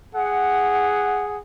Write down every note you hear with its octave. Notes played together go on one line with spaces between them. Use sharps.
G#4 F#5